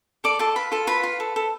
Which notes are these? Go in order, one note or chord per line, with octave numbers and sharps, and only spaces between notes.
A4 D5 D6
F4 A4 A5
F4 B4 B5
F4 A4 A5
F4 B4 B5
F4
A4
A4